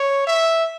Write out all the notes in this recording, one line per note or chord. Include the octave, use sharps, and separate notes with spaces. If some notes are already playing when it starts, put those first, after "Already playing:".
Already playing: C#5
E5